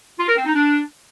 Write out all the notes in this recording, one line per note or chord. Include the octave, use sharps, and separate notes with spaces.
F4
A#4
C4
D#4
D4